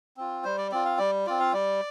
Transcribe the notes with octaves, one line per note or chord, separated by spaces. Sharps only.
C4 F4
G3 C5
D5
C4 F4 D5
F5
G3 D5
C4 F4 D5
F5
G3 D5